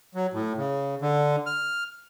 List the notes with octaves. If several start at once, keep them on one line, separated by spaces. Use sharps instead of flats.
F#3
A2
C#3
D3
F6